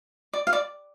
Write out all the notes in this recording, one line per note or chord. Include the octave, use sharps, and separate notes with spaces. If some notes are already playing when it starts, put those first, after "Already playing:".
D5
F5
D5